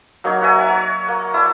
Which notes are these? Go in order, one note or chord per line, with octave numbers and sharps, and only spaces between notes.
F#3 A#3 D#4 C#5
F#4 C#5 E5 G#5
C#5
C#5
A#3
E4 D5 A5